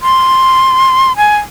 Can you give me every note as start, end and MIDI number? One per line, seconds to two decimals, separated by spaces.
0.01 1.16 84
1.17 1.37 80